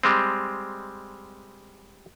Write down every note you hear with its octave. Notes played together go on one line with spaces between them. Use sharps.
G3 G#3 C4